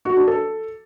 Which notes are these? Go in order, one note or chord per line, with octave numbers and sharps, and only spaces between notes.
F#4
D4
A4